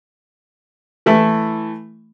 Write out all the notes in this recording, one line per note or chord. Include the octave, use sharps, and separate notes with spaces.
E3 A3 E4